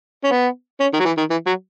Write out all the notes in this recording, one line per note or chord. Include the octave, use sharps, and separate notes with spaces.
C#4
B3
C#4
D#3
F#3
E3
D#3
E3
F#3